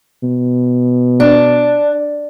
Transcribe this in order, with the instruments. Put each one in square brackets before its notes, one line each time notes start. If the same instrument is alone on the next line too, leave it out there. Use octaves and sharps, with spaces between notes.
[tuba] B2
[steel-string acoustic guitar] D4